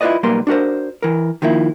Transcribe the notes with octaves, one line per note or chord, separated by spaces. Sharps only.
E4 F4 G4 B4 D5 D#5
B1 G3 A#3 A#4 B4 C6
D4 F#4 A#4 C5
E3 A#4
D#3 F3 A#3 E4